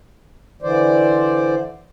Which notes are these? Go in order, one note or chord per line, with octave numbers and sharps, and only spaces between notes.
D3 E3 C5 D5